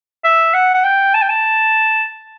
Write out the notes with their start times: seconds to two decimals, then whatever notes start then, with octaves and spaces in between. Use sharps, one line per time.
0.24 E5
0.54 F#5
0.74 F#5
0.84 G5
1.14 A5
1.22 G5
1.29 A5